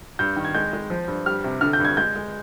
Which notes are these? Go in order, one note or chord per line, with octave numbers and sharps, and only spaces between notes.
G2 G6
D#3
G#6
G#3 G6
G#3
F3
G2
G3 F6
C3
D3 F6
G6
G2 G#6
G#3 G6
G#3